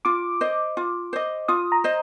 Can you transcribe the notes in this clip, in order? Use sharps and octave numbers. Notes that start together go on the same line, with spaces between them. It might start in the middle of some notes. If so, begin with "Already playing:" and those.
F4 D6
C5 D#5
F4
C5 D#5
F4 D#6
A#5
C5 D#5